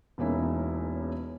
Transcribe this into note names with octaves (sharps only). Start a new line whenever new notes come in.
E1 E2 A#3 C#4 D#4 E4